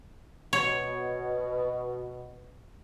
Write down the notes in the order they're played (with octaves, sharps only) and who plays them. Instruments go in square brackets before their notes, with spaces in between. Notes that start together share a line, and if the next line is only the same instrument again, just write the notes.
[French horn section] B2 [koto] C#5